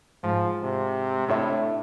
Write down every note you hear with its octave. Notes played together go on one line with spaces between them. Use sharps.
G#2 F3
C3
A2 D4 C#5 E5